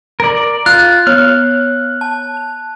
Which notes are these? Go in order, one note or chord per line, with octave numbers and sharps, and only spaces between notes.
A#4 D5
F4 F#6
B3 C#5 F6
A5